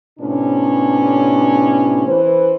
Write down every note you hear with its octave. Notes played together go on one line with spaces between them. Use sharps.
A2 C3 B3 C#4 D4
E3 B4 C5